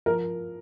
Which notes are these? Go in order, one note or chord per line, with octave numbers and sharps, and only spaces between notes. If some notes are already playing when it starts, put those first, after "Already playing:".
F3 A#4